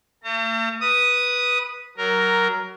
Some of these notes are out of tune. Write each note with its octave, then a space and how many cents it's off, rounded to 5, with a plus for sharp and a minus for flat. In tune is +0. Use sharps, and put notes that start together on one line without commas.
A3 +45 A#5 -45
B4 -10 D#6 +0
F#3 +25 A#4 +0